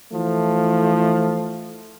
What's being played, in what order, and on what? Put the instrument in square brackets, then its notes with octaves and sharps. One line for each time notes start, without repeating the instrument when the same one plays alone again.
[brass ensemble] E3 F3 A3